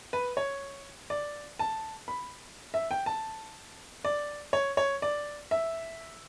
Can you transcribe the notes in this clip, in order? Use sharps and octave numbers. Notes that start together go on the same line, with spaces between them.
B4
C#5
D5
A5
B5
E5
G5
A5
D5
C#5
C#5
D5
E5